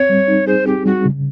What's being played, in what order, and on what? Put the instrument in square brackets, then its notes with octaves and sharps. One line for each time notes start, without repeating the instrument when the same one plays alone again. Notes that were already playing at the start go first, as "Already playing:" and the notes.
Already playing: [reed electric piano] C4 [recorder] C#5
[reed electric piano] G3
D#4
[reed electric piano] G#4 [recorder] C5
[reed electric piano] C4 [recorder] G4
[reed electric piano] G3 [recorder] F#4
[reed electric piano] C#3